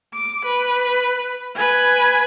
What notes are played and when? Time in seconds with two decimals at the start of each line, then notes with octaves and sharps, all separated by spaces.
0.14 D6
0.45 B4
1.57 B4 G#5